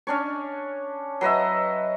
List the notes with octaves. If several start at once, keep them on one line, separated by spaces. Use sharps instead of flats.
C#4 D4 C#5
F#3 B4 D#5 E5